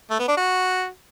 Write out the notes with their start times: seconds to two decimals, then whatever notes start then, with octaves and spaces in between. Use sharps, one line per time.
0.10 A3
0.19 B3
0.28 D4
0.37 F#4